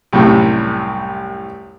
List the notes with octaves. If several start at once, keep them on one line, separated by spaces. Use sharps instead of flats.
C2 F#2 A2 C3 G3